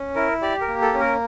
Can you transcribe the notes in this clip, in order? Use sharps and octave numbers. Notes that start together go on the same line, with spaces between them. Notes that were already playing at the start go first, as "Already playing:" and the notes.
Already playing: C#4
E4 A#4
G4 D5
A#4
A#3
A4
C#4
A#4